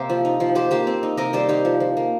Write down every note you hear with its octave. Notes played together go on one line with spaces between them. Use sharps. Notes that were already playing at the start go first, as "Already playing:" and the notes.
Already playing: C3 A#3 G4 A#4 C5 D#5
F3
D#4
F3
F3 G4 C5
A#3 G4 C5
C4
D#4
C3 A#4 D#5
G3 G4 C5
D#4 G4 C5
F3
F3
A#3